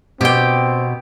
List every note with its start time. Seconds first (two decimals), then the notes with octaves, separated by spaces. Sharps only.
0.21 B2 C4 G4 G5